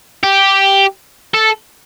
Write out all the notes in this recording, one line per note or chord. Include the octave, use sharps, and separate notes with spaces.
G4
A4